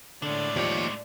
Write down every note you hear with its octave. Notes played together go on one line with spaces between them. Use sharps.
A2 D3 G#3 D4 D5
D#2 F3 G4 C#5